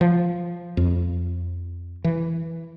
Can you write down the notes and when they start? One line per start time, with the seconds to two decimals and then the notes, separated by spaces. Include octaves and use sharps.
0.01 F3
0.77 F2
2.04 E3